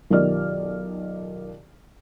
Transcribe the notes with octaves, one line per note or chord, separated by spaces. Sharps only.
B1 D#3 F4 G4 D5 F6